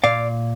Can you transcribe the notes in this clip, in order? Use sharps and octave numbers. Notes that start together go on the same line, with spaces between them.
A#2 D5 F5